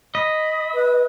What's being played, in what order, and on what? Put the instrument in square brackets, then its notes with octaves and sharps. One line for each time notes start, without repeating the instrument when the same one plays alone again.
[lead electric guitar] D#5 [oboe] B5
[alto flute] B4